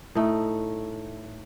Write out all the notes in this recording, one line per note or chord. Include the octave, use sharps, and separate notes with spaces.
A2 A3 D#4